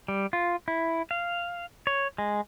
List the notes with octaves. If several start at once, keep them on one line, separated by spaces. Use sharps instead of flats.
G3
F4
E4
F5
C#5
G#3